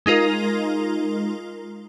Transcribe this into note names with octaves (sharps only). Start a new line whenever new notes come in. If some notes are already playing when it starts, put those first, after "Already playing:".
G#3 D#4 F4 A#4